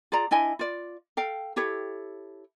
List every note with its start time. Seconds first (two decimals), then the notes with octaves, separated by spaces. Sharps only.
0.12 F4 G#4 D5 A#5
0.31 D4 E4 D#5 G#5
0.59 F4 D5
1.17 A4 F5 G5
1.56 E4 G4 A4 C#5